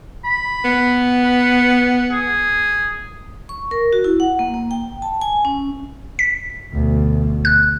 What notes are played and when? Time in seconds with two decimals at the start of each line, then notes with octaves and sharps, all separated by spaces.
0.24 B5
0.65 B3
1.24 B4
2.11 G#4
3.49 C#6
3.71 A#4
3.93 F#4
4.04 E4
4.20 F#5
4.39 A#3
4.54 A#3
4.71 G5
5.02 A5
5.22 G#5
5.45 C#4
6.19 B6
6.73 D2 B2
7.45 F#6